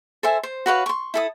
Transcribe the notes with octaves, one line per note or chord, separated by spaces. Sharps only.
A4 C5 E5 G#5
C5
F#4 B4 C#5 F5
C6 C#6
E4 A4 D#6